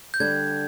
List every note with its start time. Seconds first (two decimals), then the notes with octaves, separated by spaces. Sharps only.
0.14 G6
0.20 D3 G3 D4 G#6